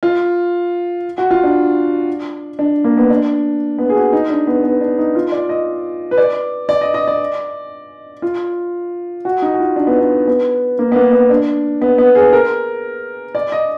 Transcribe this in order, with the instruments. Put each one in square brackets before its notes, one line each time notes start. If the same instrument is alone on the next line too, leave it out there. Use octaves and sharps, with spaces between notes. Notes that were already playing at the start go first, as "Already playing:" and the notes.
[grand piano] F4
F#4
F4
D4
D4
A#3
B3
D4
B3
G#4
F#4
D#4
D4
B3
B3
D4
D#4
F4
D5
D#5
B4
D5
D5
D#5
D#5
D5
F4
F#4
D#4
F#4
F4
D4
B3
D4
B3
A#3
B3
A#3
B3
D4
B3
B3
G#4
A#4
D5
D#5